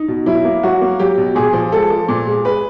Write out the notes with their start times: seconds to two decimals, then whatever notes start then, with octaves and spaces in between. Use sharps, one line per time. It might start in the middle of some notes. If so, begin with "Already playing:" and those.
Already playing: D#4
0.08 B2
0.26 F#3 E4
0.45 A#3
0.63 F#3 F#4
0.81 A#3
0.99 F#3 G4
1.18 B2
1.35 A#2 G#4
1.53 F3
1.72 G#3 A4
1.90 F3
2.09 A#2
2.27 G#3
2.45 G#3 B4